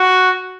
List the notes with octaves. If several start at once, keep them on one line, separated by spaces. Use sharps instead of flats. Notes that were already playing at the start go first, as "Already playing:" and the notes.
Already playing: F#4